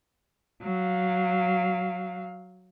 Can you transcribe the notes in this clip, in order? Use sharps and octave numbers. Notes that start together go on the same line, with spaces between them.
F#3 F5